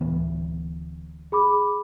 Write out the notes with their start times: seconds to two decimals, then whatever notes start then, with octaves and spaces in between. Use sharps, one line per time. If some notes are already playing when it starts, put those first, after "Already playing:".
0.01 D1 E3 B3
1.32 G#4 B5 D6